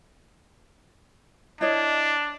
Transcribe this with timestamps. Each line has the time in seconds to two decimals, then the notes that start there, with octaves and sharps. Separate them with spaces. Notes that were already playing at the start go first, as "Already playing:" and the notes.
1.61 D4 E4 C#5 D#5